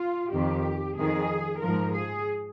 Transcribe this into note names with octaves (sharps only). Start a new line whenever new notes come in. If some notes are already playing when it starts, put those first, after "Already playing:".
Already playing: F4
F2 D#3 G4
F2 D#3 G#4
G#2 F3 A#4
G#4